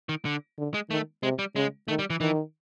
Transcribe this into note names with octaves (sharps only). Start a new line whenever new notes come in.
D#3
D3
D3
G#3
D#3 A3
C3 G#3
G3
C#3 G#3
D#3 A3
G3
E3
D#3 E3